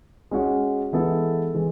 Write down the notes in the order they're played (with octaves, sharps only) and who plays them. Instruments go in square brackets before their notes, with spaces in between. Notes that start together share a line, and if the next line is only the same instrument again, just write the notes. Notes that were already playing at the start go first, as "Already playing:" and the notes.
[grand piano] G#3 C#4 F#4
E3 G#3 B3 E4 A4
E3 G#3